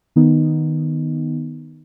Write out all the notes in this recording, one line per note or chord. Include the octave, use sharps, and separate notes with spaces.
D#3 B3 D#4